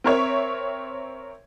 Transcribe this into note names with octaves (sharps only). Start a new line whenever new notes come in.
C4 A#4 C#5 E5